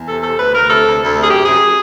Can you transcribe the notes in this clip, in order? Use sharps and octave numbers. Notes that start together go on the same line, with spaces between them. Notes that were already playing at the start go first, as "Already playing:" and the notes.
Already playing: E2
C3 A4
C3 A4
D2 B4
D2 A#4
C3 A4
D2
D2
C3
G#4
F#2 G4
F#2 G#4